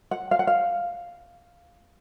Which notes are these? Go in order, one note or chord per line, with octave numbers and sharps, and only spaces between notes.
F#5
F5
F#5
F5